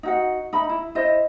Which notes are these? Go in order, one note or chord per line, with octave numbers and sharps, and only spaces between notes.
D#4 F#4 F#5
D#4 E5 B5
E4
E4 C5 D#5